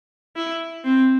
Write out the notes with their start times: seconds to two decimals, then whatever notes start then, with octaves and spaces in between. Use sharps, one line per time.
0.36 E4
0.85 C4